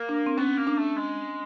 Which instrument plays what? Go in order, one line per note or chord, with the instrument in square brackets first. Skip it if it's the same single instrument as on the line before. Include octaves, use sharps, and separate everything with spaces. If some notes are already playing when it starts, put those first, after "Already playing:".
Already playing: [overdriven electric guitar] A#3
[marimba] D4
C4
[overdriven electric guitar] B3 [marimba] C#4
[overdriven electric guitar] A#3
[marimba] D4
[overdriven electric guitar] A3
G#3